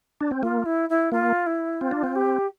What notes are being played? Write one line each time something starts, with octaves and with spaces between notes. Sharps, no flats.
D4
C4
A#3 F4
E4
E4
A#3 F4
E4
C4 F4
D4
C4
G4